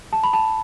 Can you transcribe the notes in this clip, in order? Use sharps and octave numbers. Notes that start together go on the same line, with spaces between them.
A5
B5
A5